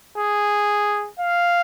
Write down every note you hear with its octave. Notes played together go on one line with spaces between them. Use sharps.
G#4
F5